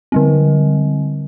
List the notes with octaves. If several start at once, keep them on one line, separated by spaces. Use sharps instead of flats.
D3 G3 C4